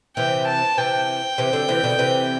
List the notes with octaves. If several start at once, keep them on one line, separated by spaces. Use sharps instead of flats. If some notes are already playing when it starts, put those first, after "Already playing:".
C3 E3 G5
A5
C3 E3 G5
C3 E3
D3 F#3
C3 E3
B2 D3
C3 E3